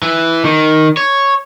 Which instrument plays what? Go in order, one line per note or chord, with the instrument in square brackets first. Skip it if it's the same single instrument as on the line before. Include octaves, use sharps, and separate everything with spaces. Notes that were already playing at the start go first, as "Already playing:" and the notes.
[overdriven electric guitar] E3
D#3
C#5